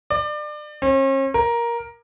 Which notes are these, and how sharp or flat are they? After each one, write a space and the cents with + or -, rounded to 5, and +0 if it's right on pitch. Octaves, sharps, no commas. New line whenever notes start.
D5 +30
C#4 -45
A#4 +10